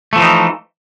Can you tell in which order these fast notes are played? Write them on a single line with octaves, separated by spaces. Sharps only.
A3 F3 E3 D#4